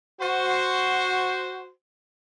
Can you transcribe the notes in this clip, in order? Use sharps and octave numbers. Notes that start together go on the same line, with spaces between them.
F#4 C5